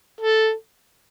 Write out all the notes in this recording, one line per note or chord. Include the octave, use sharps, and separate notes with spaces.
A4